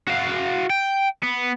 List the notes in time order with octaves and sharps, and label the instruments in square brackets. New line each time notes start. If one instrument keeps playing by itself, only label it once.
[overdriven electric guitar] F#4 F5
G5
B3